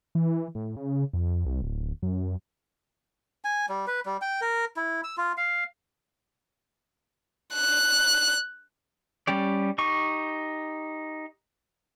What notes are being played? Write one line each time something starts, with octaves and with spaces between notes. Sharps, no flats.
E3
A2
C#3
F2
C2
D1
F#2
G#5
G3
B4
G3
G5
A#4
E4
E6
F4
F5
F#6
G3 C#4 G4 D5
D#4 G4 C#6